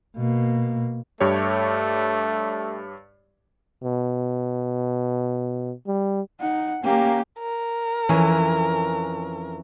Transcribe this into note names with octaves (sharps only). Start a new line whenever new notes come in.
B2 A#3
G2 A3 G4 C#5
B2
G3
D#4 F#5
A#3 C#4 G4
A#4
F2 E3 C#4